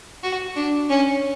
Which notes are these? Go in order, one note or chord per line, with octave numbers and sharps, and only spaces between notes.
F#4
D4
C#4